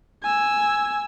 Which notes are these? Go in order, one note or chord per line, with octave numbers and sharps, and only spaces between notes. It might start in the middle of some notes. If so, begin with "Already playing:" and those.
G#5 E6